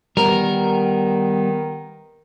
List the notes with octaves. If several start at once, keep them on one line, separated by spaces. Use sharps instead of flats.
D#3 G3 B3 A#4